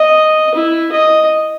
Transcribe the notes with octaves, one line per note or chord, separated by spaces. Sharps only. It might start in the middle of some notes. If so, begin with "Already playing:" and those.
Already playing: D#5
E4
D#5